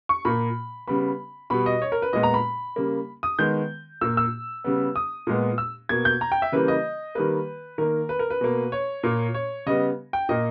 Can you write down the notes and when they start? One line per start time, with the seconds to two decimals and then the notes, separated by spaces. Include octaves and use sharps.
0.09 C#6
0.25 A#2 A#3 B5
0.88 C#3 G3 B3 B5
1.50 B2 G3 B3 B5
1.66 D#5
1.82 C#5
1.92 A#4
2.02 B4
2.13 A#2 G#3 B3 D#5
2.23 A#5
2.34 B5
2.76 C#3 G3 A#3
3.23 D#6
3.39 D#3 G#3 B3 G6
4.01 A#2 A#3 E6
4.17 E6
4.64 C#3 G3 B3
4.96 D#6
5.27 A#2 G#3 B3
5.58 E6
5.89 B2 A#3 G#6
6.05 G6
6.21 A#5
6.32 G5
6.42 E5
6.52 C#3 E3 G3 A#3 B4
6.68 D#5
7.15 D#3 G3 A#3 B4
7.78 D#3 A#3 A#4
8.09 B4
8.19 A#4
8.30 B4
8.41 B2 A#3
8.72 C#5
9.03 A#2 A#3
9.34 C#5
9.66 C#3 G3 B3 D#5
10.13 G5
10.29 A#2 A#3 D#5